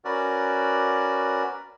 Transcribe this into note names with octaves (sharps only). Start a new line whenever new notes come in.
C#4 F#4 A#4 B4 D5